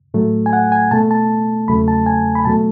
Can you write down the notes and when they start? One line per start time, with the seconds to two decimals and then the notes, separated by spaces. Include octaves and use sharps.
0.14 A2 F#3 A3
0.46 G#5
0.53 F#5
0.72 G#5
0.91 B2 A3 A5
1.11 A5
1.68 E2 C#3 F#3 A3 B5
1.88 A5
2.06 G#5
2.35 B5
2.45 B2 F#3 A3 A5